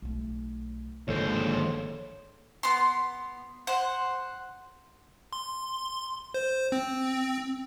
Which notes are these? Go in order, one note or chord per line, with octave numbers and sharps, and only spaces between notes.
B1 A3
G#1 D#2 G#2 D3 F3 A4 C5 C#5
B3 C6
C5 F#5
C6
C5
C4